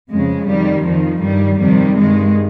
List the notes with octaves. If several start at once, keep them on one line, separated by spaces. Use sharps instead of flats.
F2 C#3 G#3
F2 D#3 G3
F2 D#3 F3
G2 D#3 G3
F2 C3 D#3 G3
G2 D#3 G#3